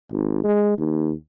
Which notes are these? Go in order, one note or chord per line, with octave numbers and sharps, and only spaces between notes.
G#1
G#3
D#2